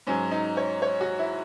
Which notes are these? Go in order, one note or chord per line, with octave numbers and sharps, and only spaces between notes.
G#2 F#3 C#4
D#4
C#5
C#5
F#4
E4